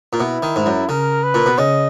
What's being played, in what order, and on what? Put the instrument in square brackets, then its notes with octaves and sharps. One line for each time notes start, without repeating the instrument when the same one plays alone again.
[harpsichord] A#2
[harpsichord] B2 [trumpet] E4
[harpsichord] D#3
G#2
F#2
[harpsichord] C#3 [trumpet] A#4
[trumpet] B4
[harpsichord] A#2
B2
[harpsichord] C#3 [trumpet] D#5